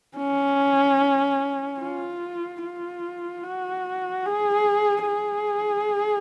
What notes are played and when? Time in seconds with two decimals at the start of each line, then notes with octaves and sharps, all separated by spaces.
0.17 C#4
1.80 F4
2.62 F4
3.44 F#4
4.25 G#4
5.07 G#4